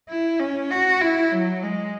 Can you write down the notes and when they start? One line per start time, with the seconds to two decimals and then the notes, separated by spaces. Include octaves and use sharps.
0.09 E4
0.40 C#4
0.71 F#4
1.01 E4
1.32 F#3
1.63 G#3